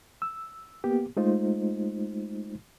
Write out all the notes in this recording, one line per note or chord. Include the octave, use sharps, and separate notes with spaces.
E6
A#3 B3 G4
G#3 A3 D#4 F4 C5